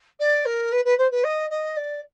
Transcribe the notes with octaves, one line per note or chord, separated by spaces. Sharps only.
D5
A#4
B4
B4
C5
B4
D#5
D#5
D5